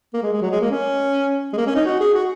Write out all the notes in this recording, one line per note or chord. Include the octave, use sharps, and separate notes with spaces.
A#3
G#3
G#3
F#3
G#3
A#3
C#4
G#3
A#3
C#4
D#4
F#4
G#4
F#4